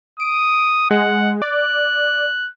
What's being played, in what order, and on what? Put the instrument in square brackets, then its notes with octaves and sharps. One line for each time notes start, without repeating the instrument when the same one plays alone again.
[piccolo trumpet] D#6 [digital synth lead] D7
[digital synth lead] G#3 [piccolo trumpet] F#5
[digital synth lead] D5 [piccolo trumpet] F#6